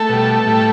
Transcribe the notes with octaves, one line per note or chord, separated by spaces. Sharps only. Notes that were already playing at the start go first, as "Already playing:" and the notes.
Already playing: A3 A4
B2 G3
A2 G3